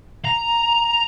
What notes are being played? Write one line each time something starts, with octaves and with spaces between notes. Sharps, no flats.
A#5